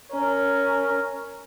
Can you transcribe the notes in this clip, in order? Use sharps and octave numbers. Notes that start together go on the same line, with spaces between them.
C#4 A#4